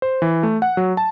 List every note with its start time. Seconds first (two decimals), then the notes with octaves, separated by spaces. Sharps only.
0.02 C5
0.22 E3
0.43 A3
0.62 F#5
0.77 F#3
0.97 A5